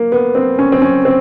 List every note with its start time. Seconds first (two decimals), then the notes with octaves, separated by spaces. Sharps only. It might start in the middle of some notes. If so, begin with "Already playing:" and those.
Already playing: A#3
0.12 B3
0.35 C4
0.59 C#4
0.72 C4
0.82 C#4
1.05 C4